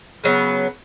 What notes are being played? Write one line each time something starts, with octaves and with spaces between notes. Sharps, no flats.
C#3 F#3 B3